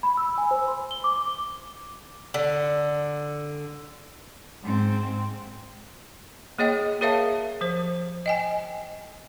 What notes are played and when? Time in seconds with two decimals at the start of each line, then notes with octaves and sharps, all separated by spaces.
0.03 B5
0.17 E6
0.38 G#5
0.51 C5
0.68 C6
0.91 G7
1.04 D6
2.34 D3
4.63 G#2 C4
6.59 A#3 G#4 C#5 D#5 G5
7.01 G#4 A#4 C#5 E5 F5 A5
7.61 F3 C5
8.26 D#5 G5 G#5